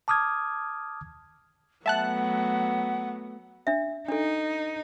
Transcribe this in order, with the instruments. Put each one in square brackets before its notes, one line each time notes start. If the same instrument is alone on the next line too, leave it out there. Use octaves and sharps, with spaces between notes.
[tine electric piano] A5 D6 D#6 F6 G#6
[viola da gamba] F#3 A3 B3 [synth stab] E5 A5 F#6 [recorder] F#5
[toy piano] D4 E5
[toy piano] D4 A4 [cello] D#4